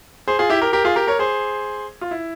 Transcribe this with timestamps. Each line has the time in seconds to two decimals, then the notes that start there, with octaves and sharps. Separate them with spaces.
0.28 G#4 C5
0.39 F4 G#4
0.50 E4 G4
0.62 G4 A#4
0.73 G4 A#4
0.84 F4 G#4
0.96 G4 A#4
1.07 A#4 C#5
1.19 G#4 C5
2.01 F4
2.11 E4